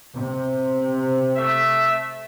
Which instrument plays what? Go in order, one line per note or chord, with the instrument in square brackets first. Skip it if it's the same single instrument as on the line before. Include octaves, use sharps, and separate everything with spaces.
[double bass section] C3
[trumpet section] A3 E5